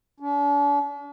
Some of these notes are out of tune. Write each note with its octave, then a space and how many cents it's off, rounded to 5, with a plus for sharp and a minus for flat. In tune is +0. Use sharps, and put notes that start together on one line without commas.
D4 -45